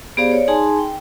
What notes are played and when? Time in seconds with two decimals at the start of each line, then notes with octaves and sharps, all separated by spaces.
0.17 B3 G4 G#4 C5 D5 F5
0.31 C#5 D5
0.48 D#4 G#4 G#5 A5 C6
0.79 G5